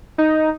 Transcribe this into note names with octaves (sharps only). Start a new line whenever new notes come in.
D#4